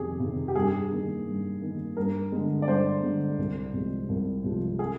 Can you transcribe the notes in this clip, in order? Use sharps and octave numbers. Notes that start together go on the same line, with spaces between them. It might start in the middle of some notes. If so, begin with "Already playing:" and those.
Already playing: F2 C3 D#3 G4 G#4
C3 D#3
G4
G2 G#4
D#3 A#3
G2
D#3 A#3
G2 A#4
D3 G#3
D5
G2 C5
D3 G#3
C2
C3 F3 G#3
C2
C3 F3 G#3
G#4